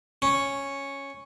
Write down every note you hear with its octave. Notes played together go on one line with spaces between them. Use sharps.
C#4